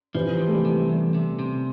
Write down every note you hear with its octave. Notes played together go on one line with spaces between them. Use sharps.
C3 E3 F3
C3
A3
E3 G3
C3
E2
C3
C3